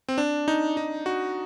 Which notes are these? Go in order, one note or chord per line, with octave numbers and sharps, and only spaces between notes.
C4
D4
D#4
D#4
F#4